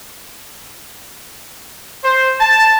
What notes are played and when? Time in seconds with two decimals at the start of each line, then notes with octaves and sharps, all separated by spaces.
2.04 C5
2.40 A5